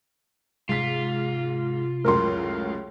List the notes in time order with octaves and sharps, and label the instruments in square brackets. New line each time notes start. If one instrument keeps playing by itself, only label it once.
[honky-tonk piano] G#2 B6 [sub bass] C3 [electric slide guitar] F4
[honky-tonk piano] C#2 F#2 A2 [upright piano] A#4 C6